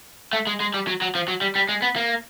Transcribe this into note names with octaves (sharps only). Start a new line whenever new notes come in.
A3
G#3
G#3
G3
F#3
F#3
F3
F#3
G3
G3
G#3
B3
A#3